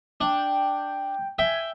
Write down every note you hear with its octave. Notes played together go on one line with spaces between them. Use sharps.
D4 G5
E5 G5 G#5